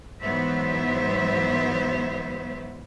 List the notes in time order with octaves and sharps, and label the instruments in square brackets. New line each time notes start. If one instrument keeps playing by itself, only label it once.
[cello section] G#2 E3 F#3 B3 C5 E5